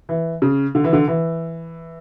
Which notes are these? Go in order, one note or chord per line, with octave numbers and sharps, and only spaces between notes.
E3
C#3
D3
E3
D3
E3